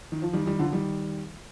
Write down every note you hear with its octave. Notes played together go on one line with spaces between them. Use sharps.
D#3
F3
D#3 G3
D#3 G3
D3 F3
D#3 G3